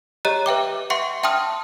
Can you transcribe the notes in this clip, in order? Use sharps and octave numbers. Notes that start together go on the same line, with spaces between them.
G4 C#5 D#5 A#5 F#6
B4 E5 G5 D6
E5 F#5 C6 C#6 C#7
E5 G5 A5 C6 D#6 F6